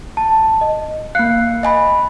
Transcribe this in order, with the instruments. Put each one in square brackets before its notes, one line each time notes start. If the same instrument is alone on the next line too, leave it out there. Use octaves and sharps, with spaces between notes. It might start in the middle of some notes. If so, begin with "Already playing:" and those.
[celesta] A5
D#5
[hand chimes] A#3 F5 [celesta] F#6 C7 C#7
[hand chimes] D#5 G#5 B5